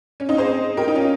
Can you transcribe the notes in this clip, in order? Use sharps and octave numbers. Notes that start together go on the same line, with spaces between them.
C#4
C4 D#4
G#4 C5
G4 A#4
D#4
C#4 F4